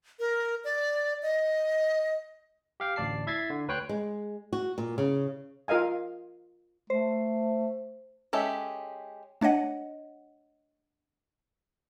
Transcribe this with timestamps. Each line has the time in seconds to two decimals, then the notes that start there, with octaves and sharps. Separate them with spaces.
0.19 A#4
0.64 D5
1.23 D#5
2.80 G4 F5 G5
2.96 A1 D2 D5 A5 C7
3.27 E4 E5 G#6 A6 C7
3.50 D3
3.68 D2 B4 C#5 G5 C6 F#6
3.89 G#3
4.53 F#4
4.78 A#2
4.98 C#3
5.68 F4 A#4 D#5 F5 G#5
6.90 A3 C5
8.33 G#3 C#4 G4 A4 E5
9.41 A3 D4 C#5 D#5 F#5